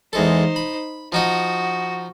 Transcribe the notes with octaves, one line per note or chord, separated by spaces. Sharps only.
E2 G#3 D#4 A4 C5
B5
F3 D#4 F#4 D#5